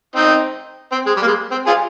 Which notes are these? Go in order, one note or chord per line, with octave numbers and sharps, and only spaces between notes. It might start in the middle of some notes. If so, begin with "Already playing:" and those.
C4 D#4
C4
G#3
G3
A#3
G#3
C4
F4 G#4